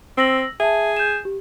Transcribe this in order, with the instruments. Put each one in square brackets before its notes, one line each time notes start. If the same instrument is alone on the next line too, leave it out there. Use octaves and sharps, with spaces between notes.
[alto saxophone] C4 [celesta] E6 A#6 F#7
[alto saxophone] G#4 [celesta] E5 A5
[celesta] G6 E7
G4